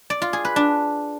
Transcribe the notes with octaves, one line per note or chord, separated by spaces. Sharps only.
D5
F4
G#4
B4
D4